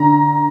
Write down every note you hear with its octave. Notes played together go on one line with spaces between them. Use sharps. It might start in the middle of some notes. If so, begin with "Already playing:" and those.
Already playing: D3 A#5